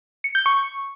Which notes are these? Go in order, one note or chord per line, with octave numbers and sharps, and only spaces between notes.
C#7
G6
C#6